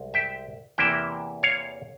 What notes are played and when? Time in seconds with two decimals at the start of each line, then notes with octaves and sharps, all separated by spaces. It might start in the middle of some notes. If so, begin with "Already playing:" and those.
Already playing: C2 G#3
0.14 E5 G5
0.78 E2 C3 E3 A#3 E4 E5 G5
1.43 C#5 F5